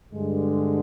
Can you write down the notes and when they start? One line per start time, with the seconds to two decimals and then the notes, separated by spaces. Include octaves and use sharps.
0.13 G2 D3 G#3